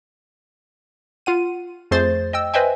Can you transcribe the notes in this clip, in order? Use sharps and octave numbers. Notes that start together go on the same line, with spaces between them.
F4 F#5 D#7
F2 A3 G#4 C5 A6
D#5 G5 E6
B4 C5 D#5 E5 G5 G#5